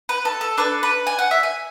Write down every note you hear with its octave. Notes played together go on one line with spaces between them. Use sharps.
B4
A4
A4
D4 A4 B4
B4
G#5
F#5
E5
G#5